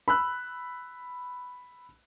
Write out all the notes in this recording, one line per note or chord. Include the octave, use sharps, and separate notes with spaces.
B5 E6 F#6